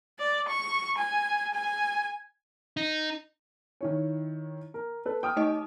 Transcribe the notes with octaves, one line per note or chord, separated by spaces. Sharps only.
D5
C#6
G#5
G#5
D#4
D#3 E4 C#5
A#4
A4 B4
G5 D#6 F6
A3 D#4 D#5